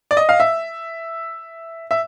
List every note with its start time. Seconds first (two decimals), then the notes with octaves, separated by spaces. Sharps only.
0.11 D5
0.17 D#5
0.29 F5
0.40 E5
1.91 E5